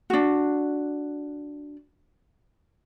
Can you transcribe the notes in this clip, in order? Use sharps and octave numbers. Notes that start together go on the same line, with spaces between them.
D4 F#4